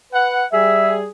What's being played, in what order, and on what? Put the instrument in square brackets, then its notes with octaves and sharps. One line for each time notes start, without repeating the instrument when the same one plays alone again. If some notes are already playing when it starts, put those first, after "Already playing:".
[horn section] B4 F#5
[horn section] G3 G#4 [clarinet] E5